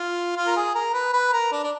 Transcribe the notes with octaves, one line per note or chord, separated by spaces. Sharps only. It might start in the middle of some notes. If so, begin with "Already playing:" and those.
Already playing: F4
F4
A#4
G#4
A#4
B4
B4
A#4
D4
D4